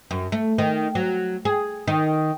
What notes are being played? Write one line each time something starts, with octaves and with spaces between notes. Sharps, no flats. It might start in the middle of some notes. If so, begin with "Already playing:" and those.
F#2
A3
D#3
F#3
G#4
D#3